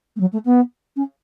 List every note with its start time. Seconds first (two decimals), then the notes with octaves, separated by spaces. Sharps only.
0.16 A3
0.20 F#3
0.32 A3
0.45 B3
0.96 C#4